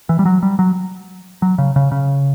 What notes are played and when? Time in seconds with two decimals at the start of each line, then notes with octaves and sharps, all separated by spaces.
0.09 E3
0.19 G3
0.25 F#3
0.43 G3
0.59 F#3
1.42 F#3
1.58 C#3
1.76 C#3
1.91 C#3